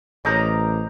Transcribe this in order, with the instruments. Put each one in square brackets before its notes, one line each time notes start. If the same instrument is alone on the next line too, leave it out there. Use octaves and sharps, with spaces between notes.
[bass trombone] A1 [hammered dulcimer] A#4 A#5 D6 [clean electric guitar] C5 D#5